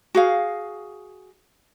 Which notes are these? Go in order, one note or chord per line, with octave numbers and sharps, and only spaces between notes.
F#4 G#4 F5